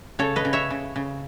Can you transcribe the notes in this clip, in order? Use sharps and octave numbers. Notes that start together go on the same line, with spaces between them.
C#3 A4 C#5
B4 D#5
C#3
C#5 E5
C#3
C#3